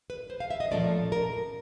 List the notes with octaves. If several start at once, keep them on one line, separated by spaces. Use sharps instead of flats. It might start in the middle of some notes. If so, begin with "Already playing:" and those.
B4
C5
F5
E5
D#5
A#2 F3 A3 C#4 D5
A#4